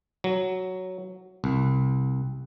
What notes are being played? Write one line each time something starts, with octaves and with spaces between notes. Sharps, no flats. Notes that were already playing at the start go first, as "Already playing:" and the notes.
F#3
C2